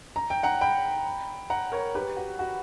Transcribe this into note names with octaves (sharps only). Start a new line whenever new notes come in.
A#5
G5
F#5 A#5
G5 B5
F#5 A#5
A#4 C#5
G4 B4
F#4
F#4